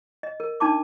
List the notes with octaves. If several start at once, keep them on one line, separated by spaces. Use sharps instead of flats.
D#5
A#4
D4 D#4 A5 D6